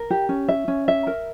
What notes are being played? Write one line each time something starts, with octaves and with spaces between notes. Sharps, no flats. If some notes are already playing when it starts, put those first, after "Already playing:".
Already playing: A#4
G4
C#4
E5
C#4
E5
A#4